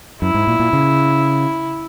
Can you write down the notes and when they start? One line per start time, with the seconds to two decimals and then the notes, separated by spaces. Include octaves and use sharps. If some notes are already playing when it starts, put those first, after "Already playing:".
0.22 F#2 E4
0.34 G#2
0.47 A#2
0.60 A#2
0.73 C#3